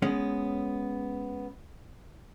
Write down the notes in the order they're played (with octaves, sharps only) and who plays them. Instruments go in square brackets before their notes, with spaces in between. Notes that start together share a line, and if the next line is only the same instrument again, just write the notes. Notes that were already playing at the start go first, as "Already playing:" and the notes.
[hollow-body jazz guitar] G#3 B3 C#4